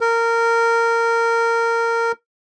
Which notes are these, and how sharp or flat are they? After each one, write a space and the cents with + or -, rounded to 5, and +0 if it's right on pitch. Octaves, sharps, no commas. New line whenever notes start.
A#4 -15